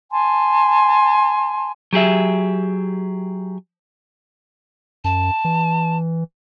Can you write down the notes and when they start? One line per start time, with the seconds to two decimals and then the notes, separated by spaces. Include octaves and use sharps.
0.10 G#5 A5 C6
1.93 F#3 G4 G#4 E5
5.04 F#2 A5
5.45 E3